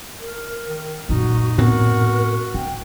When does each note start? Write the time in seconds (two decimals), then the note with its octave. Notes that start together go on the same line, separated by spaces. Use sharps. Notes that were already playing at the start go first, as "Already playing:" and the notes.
0.20 A#4
0.68 D#3
1.09 F#2 A#2 D#4 F#4
1.58 A2 B3 C4 F#4 A#4
2.54 D3 G5